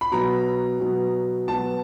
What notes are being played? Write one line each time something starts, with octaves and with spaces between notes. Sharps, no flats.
B5
B2 F#3 B3 A#5
B2 F#3 B3
B2 F#3 B3 A5